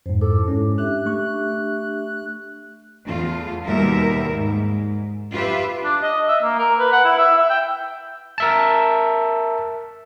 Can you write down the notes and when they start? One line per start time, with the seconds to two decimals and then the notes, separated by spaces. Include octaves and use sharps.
0.06 F2 G#2 C5
0.21 E4 A4 D6
0.48 G#2 G#3 C#4
0.78 D4 G4 E5 F#6
1.05 A3 C#6 F#6
3.05 E2 A3 F4
3.66 D#2 B2 G3 A#4 E5
4.30 G#2
5.31 F4 G4 B4 E5
5.84 D4
6.02 D#5
6.28 E5
6.42 A#3
6.59 A#4
6.79 B4
6.92 F#5
7.05 E4
7.18 E5
7.38 E5
7.50 G5
8.38 A#4 E5 A5